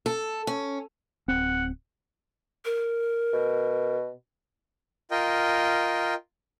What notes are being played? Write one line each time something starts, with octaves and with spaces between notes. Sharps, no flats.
A4
C#4
D1 C4 F#5
A#4
B2
F4 A#4 D#5 G5